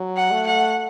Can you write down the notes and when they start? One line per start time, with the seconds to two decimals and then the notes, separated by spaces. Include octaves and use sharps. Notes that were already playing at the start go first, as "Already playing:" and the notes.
Already playing: F#3
0.17 F#5
0.31 A3
0.46 F#5